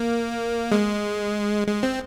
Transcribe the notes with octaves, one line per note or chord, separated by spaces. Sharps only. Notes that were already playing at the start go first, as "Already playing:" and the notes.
Already playing: A#3
G#3
G#3
C4